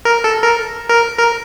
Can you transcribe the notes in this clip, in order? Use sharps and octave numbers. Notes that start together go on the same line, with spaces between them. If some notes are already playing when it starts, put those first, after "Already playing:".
A#4
A4
A#4
A#4
A#4